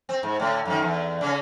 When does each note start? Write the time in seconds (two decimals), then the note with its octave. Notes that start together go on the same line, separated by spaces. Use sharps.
0.09 C4
0.23 G#2
0.40 A2 D3
0.65 F#2 B2 D#3
0.82 E2
1.21 C#3 C#4